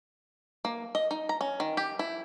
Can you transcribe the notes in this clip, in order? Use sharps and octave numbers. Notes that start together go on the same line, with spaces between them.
A#3
D#5
D#4
A#5
C#4
D#3
G4
E4